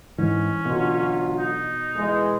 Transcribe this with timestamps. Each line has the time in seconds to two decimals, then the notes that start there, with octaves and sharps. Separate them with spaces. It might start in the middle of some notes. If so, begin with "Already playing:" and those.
0.18 G#2 E3 C#4
0.65 B2 D3 F#3 F4
1.39 D#4
1.96 E3 G#3